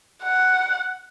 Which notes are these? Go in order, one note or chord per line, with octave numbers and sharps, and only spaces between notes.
F#5